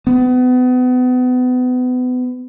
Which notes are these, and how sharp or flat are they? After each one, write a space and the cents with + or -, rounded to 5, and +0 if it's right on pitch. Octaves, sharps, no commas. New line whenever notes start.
B3 +30